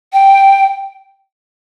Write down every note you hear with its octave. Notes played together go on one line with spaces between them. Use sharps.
G5